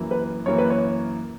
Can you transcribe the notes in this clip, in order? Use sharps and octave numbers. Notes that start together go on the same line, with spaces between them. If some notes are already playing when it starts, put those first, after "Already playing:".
Already playing: F#2 E3 A#3
B4
F#2 E3 A#3 C#5
B4
C#5